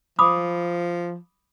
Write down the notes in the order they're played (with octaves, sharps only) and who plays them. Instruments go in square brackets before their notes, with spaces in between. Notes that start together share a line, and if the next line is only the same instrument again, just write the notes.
[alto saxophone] F3 [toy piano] B5 D6 D#6